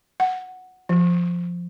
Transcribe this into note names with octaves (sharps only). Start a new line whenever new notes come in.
F#5
F3